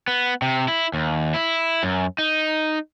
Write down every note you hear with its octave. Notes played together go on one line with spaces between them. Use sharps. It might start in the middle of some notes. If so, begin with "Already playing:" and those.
B3
C3
E4
D#2
E4
F#2
D#4